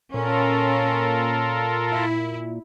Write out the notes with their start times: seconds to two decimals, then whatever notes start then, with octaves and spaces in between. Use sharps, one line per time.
0.14 A#2 C#4 F4 A4 A#4
1.92 E4